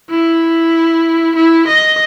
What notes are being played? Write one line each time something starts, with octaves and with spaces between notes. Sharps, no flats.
E4
E4
D#5